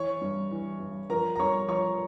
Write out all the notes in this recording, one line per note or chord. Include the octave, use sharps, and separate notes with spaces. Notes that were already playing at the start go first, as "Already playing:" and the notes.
Already playing: E3 C#5 C#6
G2
E3
G2
F3 A#4 A#5
A#5
G2 C#5 C#6
F3 C#5 C#6